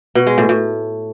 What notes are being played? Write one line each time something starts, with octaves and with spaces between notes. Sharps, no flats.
B2
G#3
A2
A2